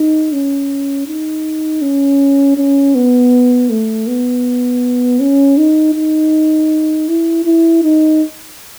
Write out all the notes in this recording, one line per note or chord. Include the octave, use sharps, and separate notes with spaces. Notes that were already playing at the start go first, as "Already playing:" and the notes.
Already playing: D#4
C#4
D#4
C#4
C#4
B3
A3
B3
C#4
D#4
D#4
E4
E4
D#4